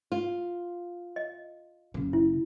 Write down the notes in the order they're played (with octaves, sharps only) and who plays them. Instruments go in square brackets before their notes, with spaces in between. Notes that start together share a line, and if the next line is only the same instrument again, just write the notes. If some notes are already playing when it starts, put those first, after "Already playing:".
[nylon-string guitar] F4
[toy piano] D#5
[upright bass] F#1 C#3
[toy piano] E4